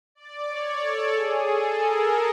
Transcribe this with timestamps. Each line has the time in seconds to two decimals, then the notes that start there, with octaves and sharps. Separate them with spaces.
0.15 D5
0.48 C#5
0.80 A4
1.13 G#4
1.46 A4
1.77 A#4